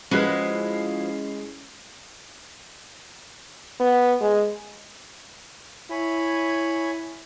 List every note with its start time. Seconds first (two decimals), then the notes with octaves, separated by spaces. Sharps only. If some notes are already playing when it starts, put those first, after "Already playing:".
0.11 F3 G#3 C#4 E4 F#4 B4 B5 C7
3.80 B3
4.21 G#3
5.91 E4 C#5 G#5 B5